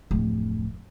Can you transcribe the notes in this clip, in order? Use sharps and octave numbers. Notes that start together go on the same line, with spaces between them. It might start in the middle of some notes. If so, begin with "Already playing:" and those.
D1 F2